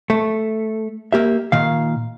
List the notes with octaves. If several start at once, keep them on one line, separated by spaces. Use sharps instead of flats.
A3
A#3 G4 E5
A#2 D#3 F5